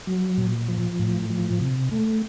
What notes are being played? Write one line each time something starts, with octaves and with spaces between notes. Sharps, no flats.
F#3
A#2
F3
A2
F3
C3
A3